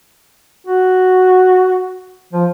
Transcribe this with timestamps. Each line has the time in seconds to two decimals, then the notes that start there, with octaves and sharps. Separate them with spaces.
0.67 F#4
2.33 F3